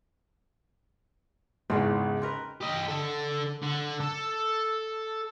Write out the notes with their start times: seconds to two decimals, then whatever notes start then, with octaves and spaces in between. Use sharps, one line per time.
1.70 G#1 E2 C#3 G#3 D#4
2.22 C4 A#4 B4
2.61 G4 D#5
2.88 D3 A4
3.63 D3
4.00 A4